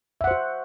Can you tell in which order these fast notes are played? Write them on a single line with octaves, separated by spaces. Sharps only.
E5 F#5 C5 F#4